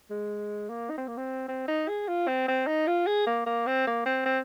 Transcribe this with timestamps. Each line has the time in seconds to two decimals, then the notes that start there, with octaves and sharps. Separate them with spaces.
0.10 G#3
0.69 A#3
0.90 D#4
0.98 C4
1.08 A#3
1.17 C4
1.48 C4
1.68 D#4
1.88 G#4
2.08 F4
2.27 C4
2.48 C4
2.67 D#4
2.87 F4
3.07 G#4
3.26 A#3
3.46 A#3
3.67 C4
3.87 A#3
4.06 C4
4.26 C4